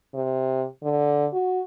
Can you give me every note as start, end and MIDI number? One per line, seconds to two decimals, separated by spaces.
0.14 0.64 48
0.83 1.26 50
1.33 1.62 66